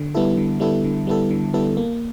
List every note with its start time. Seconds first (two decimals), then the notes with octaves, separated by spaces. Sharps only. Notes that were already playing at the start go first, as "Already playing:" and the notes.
Already playing: D3
0.14 G3 B3 E4 A4
0.37 D3
0.60 G3 B3 E4 A4
0.84 D3
1.07 G3 B3 E4 A4
1.31 D3
1.54 G3 B3 E4 A4
1.77 A#3